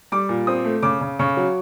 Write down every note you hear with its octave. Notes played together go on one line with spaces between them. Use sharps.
G3 D6
A#2
C4 D#6
A3
C#3 D6
C#3
C#3 C#6
F#3